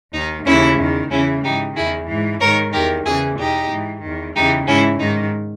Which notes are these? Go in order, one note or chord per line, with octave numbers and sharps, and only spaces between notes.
D#2 D#3 D#4
D#2 C#3 E3 C#4 E4
E2 D#3
E2 C#3 E3 C#4 E4
G#2 E3 D#4 G4
E2 D#3 E4 G#4
G#2 E3
G#2 D#3 A#4 C#5
E2 D#3 G4 A#4
E2 C#3 E3 E4 G#4
E2 B2 D#4 G4
G#2 E3
E2 D#3
E2 C#3 E3 D#4 G4
G#2 E3 C#4 E4
G#2 D#3 D#4